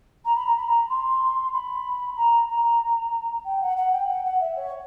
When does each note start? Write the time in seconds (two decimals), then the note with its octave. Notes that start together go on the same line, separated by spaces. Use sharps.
0.24 A#5
0.35 B5
0.46 A#5
0.56 B5
0.67 A#5
0.89 C6
1.52 B5
2.16 A#5
2.48 A#5
3.44 G5
3.60 F#5
3.77 F#5
3.92 G5
4.08 F#5
4.24 F#5
4.40 E5
4.56 C#5